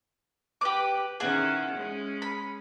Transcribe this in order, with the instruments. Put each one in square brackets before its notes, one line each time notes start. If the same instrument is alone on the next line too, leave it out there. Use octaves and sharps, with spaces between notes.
[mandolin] G4 D6 [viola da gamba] B4
[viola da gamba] D#3 C#4 E4 [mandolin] G#4 F#5
[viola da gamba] G#3 C#4
[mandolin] B5